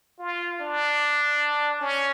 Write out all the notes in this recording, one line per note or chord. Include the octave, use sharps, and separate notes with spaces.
F4
D4
C#4